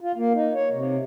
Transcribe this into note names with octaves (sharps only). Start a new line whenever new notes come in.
F4
A#3
D#4
C#5
C3